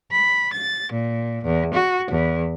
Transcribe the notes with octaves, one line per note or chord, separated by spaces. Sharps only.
B5
A6
A#2
E2
F#4
E2